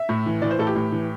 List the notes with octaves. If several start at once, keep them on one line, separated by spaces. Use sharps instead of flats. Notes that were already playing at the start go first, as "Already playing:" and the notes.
Already playing: E5
A2
E3
E3 D5
C5
A2 A4
G4
A2
E3